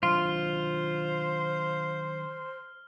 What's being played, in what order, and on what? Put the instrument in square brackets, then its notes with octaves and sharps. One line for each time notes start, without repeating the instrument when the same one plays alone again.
[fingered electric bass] D#3 F#3 D4 [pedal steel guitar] F4 [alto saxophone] C5 [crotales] F6